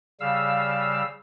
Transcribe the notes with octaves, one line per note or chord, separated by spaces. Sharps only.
C#3 G3 F5 E6